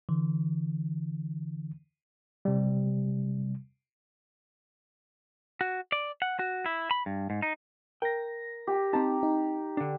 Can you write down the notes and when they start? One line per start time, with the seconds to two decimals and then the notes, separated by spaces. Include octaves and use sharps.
0.09 D3 E3
2.45 C3 G3
5.61 F#4
5.92 D5
6.22 F#5
6.39 F#4
6.66 E4
6.91 B5
7.06 G2
7.30 G#2
7.42 D#4
8.02 A#4 G5 A#6
8.67 G4
8.93 C4 D#4 A5 A#5
9.23 D#4
9.77 D3 D4